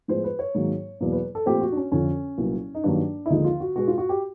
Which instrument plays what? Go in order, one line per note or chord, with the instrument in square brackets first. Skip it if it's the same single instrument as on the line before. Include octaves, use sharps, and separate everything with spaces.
[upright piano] A2 F3 G#3 B3 C5
B4
C#5
G#2 D#3 F#3 A#3
E2 B2 F#3 A#3
B4
A4
A#2 F3 A3 C4 G4
F#4
D4
C#4
F2 D3 F3 C#4
C2 A#2 F#3 B3
D#4
G2 D#3 F#3 A#3 D4
E4
D#2 D3 F3 G#3 D#4
F4
F#4
B2 G#3 B3 F#4
F4
F#4
G4